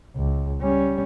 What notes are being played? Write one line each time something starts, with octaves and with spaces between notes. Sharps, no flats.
C#2
G3 C#4